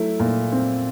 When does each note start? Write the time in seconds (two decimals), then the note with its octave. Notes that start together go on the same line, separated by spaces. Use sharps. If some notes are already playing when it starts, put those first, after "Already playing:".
Already playing: F#3 A3 E4
0.20 A#2
0.52 C4